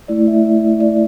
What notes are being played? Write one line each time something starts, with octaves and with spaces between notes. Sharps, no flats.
A3 E4 D5
E5
D5